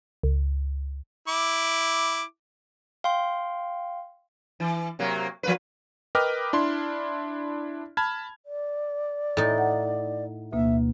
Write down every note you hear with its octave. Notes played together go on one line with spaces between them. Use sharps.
C#2
E4 D6
F5 G5 C6
E3
C3 F#3 A#3
F3 A#3 B4
A#4 B4 D#5 G5 D6 F6
D4 E4 C6
A5 B5 F6 G#6
D5
A2 D#4 A6
F#5
D2 B2 A#3 E5